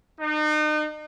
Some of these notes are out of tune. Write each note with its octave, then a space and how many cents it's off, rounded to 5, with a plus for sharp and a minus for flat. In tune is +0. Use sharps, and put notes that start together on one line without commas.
D#4 -35